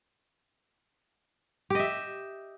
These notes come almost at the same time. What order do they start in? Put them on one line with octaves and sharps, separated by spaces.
G4 D#5 E5